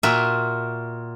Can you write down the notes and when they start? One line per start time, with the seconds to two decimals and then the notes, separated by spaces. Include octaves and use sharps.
0.03 A#2 F#4 A#4 E5